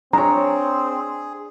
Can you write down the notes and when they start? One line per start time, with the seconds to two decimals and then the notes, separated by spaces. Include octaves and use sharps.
0.13 C4 D4 G#4 C#5 A#5